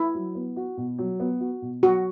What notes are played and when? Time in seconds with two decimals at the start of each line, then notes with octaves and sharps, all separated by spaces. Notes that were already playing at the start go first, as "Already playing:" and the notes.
Already playing: E4
0.15 F#3
0.35 B3
0.56 F#4
0.77 B2
0.98 F#3
1.20 B3
1.40 F#4
1.62 B2
1.83 F#3 F#4